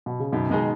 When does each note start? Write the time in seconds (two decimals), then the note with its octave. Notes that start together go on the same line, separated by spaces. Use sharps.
0.06 B2
0.20 C#3
0.32 F#2 B2 D#3
0.50 B2 D#3 G#3 D#4 G#4